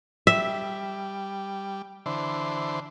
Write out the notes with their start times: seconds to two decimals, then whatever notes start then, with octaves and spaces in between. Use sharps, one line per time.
0.27 G3 E5
2.06 D3 E3 C5